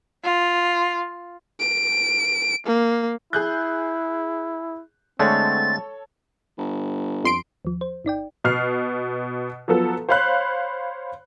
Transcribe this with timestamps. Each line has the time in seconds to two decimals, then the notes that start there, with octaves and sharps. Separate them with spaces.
0.24 F4
1.60 D7
2.67 A#3
3.33 E4 G#4 F#6 G6
5.19 D3 G#3 A3 C4 A4 C#5 A6
6.58 G1
7.24 F2 C6 D7
7.65 D#2 F3
7.81 C5
8.05 G1 D#4 D5 G5
8.44 B2 F6 C7
9.68 F3 F#3 B3 A4
10.09 C5 C#5 F5 B5 F#6